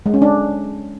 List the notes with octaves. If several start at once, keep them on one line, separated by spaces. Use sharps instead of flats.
G#3
C#4
D4